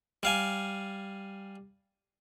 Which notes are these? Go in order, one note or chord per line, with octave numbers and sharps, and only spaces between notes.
G3 F5 G#5